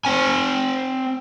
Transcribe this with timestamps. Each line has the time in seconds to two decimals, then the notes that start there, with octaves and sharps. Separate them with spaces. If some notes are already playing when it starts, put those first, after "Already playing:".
0.05 C4 G#5